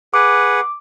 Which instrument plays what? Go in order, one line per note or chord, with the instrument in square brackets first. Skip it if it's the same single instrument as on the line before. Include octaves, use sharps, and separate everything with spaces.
[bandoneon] G#4 B4 F#5 [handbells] D6